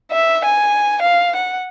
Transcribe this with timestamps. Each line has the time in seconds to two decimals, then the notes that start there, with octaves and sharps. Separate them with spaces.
0.11 E5
0.45 G#5
1.02 F5
1.35 F#5